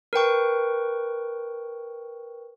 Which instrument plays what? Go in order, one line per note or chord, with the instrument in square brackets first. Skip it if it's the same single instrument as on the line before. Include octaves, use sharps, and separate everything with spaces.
[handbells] A#4 B4 G5 C#6